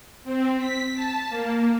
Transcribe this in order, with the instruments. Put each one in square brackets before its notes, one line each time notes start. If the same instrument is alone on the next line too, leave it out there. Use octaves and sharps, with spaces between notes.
[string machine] C4
B6
A5
A#3